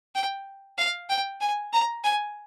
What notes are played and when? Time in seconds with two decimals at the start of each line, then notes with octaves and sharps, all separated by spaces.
0.15 G5
0.78 F5
1.09 G5
1.41 G#5
1.73 A#5
2.04 G#5